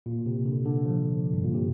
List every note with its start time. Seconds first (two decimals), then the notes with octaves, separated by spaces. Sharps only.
0.06 A#2
0.26 C3
0.46 D3
0.65 D3
0.85 F3
1.33 G2
1.44 A#2
1.54 C3